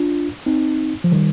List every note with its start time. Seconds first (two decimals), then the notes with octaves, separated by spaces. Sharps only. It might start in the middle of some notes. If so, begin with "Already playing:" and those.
Already playing: D4 F4
0.46 C4 D#4
1.04 F3
1.12 D#3 G3